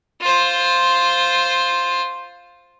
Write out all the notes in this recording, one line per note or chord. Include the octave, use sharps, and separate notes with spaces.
F4 C5